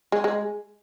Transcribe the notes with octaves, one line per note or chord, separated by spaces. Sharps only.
G#3
G#3